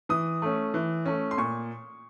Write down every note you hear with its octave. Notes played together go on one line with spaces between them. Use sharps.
E3 D#6
A3 C#4
E3
A3 C#4
C6
A#2 C#6